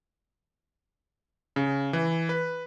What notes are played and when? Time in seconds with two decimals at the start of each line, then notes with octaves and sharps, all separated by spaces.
1.56 C#3
1.93 E3
2.29 B4